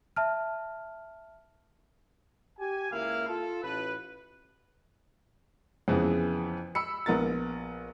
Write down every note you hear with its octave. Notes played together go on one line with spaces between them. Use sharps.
E5 A5 F6
G4 G#5
C#2 A#3 E4 F5
F4 A4
A1 B4
F2 C#3 E3 B3
B5 E6 C#7
A#1 B3 A#4 A6